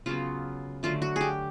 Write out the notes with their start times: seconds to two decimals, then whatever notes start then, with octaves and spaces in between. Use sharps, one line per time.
0.06 C#3 F#3 B3 F4
0.83 D3 F#3 A3 F4
1.02 F#4
1.16 G4 G#4